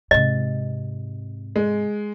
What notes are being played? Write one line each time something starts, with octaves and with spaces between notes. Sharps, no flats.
G#2 C3 D#5
G#3